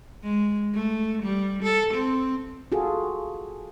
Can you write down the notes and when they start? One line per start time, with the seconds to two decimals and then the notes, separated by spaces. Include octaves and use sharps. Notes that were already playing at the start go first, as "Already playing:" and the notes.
0.23 G#3
0.74 A3
1.23 G3
1.63 A4
1.94 C4
2.72 F4 F#4 G#4 A4